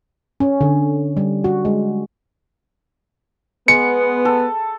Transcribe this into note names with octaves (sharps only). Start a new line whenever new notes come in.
C#4
D3
G3
F#4
G#3
G#3 B3 C#7
A4